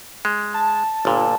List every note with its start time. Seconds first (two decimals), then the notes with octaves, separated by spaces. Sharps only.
0.25 G#3
0.54 A5
1.05 G1 A#2